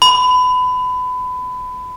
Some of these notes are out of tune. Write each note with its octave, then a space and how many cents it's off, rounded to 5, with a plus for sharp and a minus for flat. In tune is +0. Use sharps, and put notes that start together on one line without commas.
B5 +25